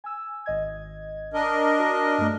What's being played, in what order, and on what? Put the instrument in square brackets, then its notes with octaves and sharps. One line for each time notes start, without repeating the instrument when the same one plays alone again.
[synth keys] G#5 E6
G#1 D#5 G#6
[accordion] D4 A#4 D#5
[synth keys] F#4 D5
G2 A3